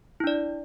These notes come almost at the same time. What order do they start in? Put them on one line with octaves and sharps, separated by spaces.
E4 D4 D5